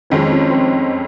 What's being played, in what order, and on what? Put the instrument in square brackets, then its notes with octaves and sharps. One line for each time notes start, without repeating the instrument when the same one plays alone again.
[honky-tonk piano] F2 D#3 G#3 [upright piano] C#4
[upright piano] C4
C#4
C4